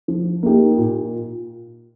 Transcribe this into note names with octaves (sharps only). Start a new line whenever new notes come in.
F3
A#3 D#4 G4
A#2